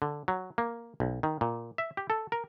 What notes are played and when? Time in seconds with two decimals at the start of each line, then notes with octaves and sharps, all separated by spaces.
0.02 D3
0.28 F#3
0.58 A#3
1.00 B1
1.23 D#3
1.41 A#2
1.78 E5
1.97 G4
2.10 A4
2.32 A#4